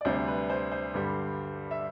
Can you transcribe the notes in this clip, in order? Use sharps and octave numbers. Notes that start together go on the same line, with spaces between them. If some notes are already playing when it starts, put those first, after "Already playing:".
D5
D2 C3 G3 D4 C5
B4
C5
C5
G2 D3 G3
E5